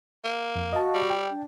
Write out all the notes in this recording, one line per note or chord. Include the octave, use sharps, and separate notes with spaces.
A#3
F2
F#4 D#5 F5 A5
G3
G5
D4